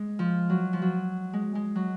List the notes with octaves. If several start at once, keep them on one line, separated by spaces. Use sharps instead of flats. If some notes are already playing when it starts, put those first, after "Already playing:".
Already playing: G#3
F3
F#3
F3
F#3
G#3
G#3
F#3